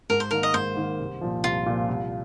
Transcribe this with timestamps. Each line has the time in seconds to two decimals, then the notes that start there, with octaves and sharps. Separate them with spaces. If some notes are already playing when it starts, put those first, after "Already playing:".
0.10 G#2 A#4
0.20 C5
0.31 D#3 A#3 A#4
0.43 D#5
0.54 G#2 C5
0.76 D#3 A#3
0.99 C2
1.21 A#2 F3
1.43 C2 F4
1.66 A#2 F3
1.89 C2